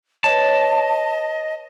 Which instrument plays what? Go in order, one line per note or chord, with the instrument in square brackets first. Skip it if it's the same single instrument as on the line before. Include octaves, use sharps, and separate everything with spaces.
[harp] B4 C#5 [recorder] D#5 [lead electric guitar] A5